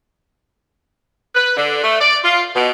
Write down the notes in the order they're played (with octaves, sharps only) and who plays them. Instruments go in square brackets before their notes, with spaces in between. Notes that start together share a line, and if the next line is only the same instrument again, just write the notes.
[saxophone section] B4
D3
A3
D5
F4
B2